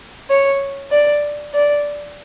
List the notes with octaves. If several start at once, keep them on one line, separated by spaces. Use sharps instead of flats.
C#5
D5
D5